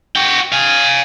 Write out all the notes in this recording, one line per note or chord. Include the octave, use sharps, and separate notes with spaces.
F#4 G5
F5 G#5